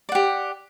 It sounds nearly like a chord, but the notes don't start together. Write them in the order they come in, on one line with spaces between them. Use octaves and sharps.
D5 F#5 G4